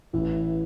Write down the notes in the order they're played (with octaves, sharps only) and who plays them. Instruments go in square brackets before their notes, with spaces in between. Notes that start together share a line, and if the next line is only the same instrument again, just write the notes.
[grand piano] A1 [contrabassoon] E3